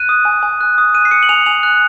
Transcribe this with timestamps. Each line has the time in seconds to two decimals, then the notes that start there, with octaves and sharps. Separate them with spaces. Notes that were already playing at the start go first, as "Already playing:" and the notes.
Already playing: F#6 D#7
0.09 D#6
0.25 G#5
0.43 G#5
0.61 F#6
0.78 D#6
0.94 F#6 D#7
1.05 C7
1.11 D#6 C#7
1.23 F#7
1.29 G#5 F7
1.46 G#5 F7
1.63 F#6